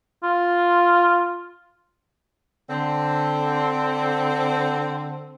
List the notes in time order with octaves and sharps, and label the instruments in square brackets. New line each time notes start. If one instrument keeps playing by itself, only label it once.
[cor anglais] F4
[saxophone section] D3 C4